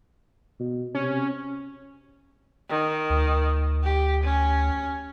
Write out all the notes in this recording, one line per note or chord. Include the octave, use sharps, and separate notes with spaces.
B2
C3 C#4
D#3
D2
G4
C#4